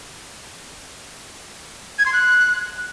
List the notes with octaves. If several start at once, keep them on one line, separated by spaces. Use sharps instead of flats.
G#6
C6
F#6